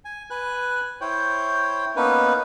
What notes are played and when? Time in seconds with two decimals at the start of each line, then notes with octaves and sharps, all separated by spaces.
0.05 G#5
0.30 B4 G#5 F#6
1.01 E4 C5 C#5 G5
1.96 A#3 B3 C#4 D#4 B4